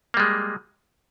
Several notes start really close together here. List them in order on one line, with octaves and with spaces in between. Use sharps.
A#3 G3 G#3